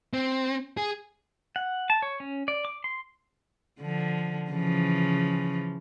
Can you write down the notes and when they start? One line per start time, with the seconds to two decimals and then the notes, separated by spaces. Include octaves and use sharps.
0.13 C4
0.77 G#4
1.56 F#5
1.90 A5
2.02 C#5
2.20 C#4
2.48 D5
2.65 D6
2.84 C6
3.80 D3 F3
4.51 C#3 E3 F3